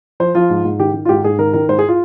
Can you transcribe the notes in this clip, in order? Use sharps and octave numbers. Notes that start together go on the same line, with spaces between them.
F3 C5
F3 F4
G#2
G#2
D#3 G4
D#3
F4
G#2 G4
G#2 G#4
D#3 A#4
D#3 A#4
G#2 C5
G#4
F4